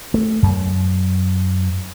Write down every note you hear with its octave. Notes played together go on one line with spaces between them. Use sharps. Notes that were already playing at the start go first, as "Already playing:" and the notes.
A3
F#2